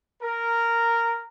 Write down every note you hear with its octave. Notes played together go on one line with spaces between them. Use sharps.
A#4